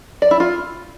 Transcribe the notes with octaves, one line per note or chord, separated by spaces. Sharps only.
D5
E4
F4